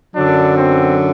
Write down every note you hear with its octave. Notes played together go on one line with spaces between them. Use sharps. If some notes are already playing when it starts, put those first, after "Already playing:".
F#2 D3 F#3 D4
C4